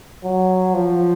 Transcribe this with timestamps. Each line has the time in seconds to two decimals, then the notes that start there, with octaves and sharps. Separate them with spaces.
0.24 F#3
0.74 F3